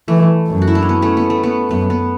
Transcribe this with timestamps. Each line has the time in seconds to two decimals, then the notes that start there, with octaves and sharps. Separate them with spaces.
0.08 E3 A3
0.48 F#2
0.62 F#4
0.67 E4
0.75 D4
0.82 C#4
0.89 B3
1.02 A3 C#4
1.17 B3
1.30 A3
1.43 B3
1.70 F#2 B3
1.90 B3